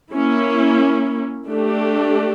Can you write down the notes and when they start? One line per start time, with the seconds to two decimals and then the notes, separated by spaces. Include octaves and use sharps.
0.10 A#3 C#4 E4
1.47 A3 D4 G4